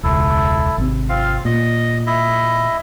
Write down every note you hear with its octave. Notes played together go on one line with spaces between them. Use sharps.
E1 C#2 E4 A4
G#1 C3
C4 F4 F5
A#2 D#5
E4 D#5 E5